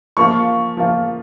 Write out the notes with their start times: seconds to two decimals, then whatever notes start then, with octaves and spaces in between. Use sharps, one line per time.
0.17 F3 A#3 F4 C#6
0.77 F3 A#3 F4